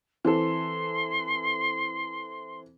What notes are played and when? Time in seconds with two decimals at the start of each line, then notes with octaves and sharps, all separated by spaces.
0.25 E3 C4 A4 C6